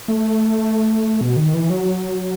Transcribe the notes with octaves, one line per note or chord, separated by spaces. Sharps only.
A3
B2
D#3
E3
F#3